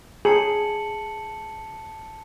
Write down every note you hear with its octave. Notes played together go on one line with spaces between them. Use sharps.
G#4 A5 C#7 F#7